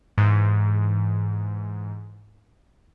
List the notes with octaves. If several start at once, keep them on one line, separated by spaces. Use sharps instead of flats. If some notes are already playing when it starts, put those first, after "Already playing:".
G#2 E3